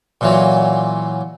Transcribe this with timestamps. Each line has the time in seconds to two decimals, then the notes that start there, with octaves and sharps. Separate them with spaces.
0.21 A#2 E3 F#3